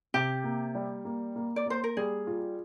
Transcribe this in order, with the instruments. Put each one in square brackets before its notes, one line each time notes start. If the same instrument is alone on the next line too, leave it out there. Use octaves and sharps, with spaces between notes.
[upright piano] C3 [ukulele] G4
[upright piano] A#3
G3
A#3
A#3
[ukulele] D5
[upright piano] A#3 [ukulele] C5
[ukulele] A#4
[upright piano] G3 [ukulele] G#4
[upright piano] F4